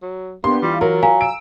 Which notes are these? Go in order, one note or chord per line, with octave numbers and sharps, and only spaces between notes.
F#3
A#3 B3 D4 G4 C6
E3 G3 F4
F#3 A#4
F5 G#5 A#5
E6 D7